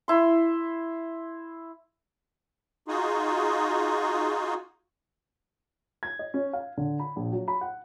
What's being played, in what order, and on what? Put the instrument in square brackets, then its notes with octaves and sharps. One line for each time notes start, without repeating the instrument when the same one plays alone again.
[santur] E4 C6
[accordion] D#4 F4 F#4 G#4
[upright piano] G#6
D#5
C#4
F5
D3
B5
A#1
F#3
B5
F#5